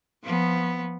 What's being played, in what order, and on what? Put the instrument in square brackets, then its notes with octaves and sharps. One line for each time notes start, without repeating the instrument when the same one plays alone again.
[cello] F3 B3